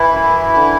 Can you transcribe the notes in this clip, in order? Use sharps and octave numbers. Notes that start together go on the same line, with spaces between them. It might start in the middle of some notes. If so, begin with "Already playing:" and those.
Already playing: E3 E4
F#2
D3